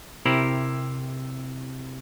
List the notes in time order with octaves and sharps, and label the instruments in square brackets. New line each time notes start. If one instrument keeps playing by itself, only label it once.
[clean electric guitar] C3 E4 G4 A#4 C5 B5